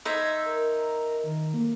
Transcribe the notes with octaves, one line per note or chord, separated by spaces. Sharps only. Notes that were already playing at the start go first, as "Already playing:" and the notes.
D#4 C5 E5 G#6
A#4
D#3
A#3